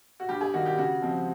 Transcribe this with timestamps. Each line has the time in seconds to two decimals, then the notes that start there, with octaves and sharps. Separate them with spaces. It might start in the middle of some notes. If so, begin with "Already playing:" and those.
0.20 F#4
0.28 G2 G4
0.41 G#4
0.53 D#3 G3 A#3 F#4
0.66 G4
0.78 C#3 F#4
1.02 F3 G#3 C4